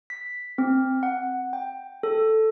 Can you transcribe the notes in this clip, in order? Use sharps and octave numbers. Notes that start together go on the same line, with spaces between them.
B6
C4
F#5
G5
A4